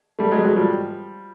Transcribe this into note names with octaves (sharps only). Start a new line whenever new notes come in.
G3 A3
F#3 G#3
F#3 G#3
F3 G3